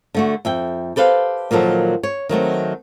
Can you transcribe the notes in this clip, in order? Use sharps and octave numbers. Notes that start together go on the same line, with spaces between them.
D3 A3 F#4
F2 E5 G5
G4 A4 B4 C5 F5
A#2 D#3 F3 F#3 A4
C#5
D#3 F#3 A3 C4